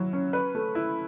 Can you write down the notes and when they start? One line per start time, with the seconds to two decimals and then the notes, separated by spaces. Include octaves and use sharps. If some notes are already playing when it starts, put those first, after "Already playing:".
Already playing: F#3 E4
0.13 C#4
0.33 B4
0.55 A3
0.75 E4